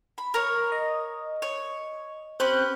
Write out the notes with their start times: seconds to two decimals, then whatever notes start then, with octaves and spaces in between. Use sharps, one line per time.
0.18 B5
0.34 A#4 C#5
0.72 D#5
1.42 C#5
2.40 C4 C#4 G4 B4 F#6 G6